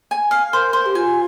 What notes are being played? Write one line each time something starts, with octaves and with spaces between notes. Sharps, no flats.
G#5
F5
A#4 C5
C5
G4
F4 G#5